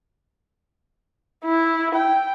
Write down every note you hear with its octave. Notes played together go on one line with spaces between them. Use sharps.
E4
G5